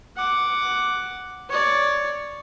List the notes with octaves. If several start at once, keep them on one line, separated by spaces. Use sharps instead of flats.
F#5 D6
C#5 D5